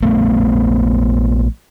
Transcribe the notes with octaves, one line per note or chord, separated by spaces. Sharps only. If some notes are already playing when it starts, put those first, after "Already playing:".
A#1 A3 B3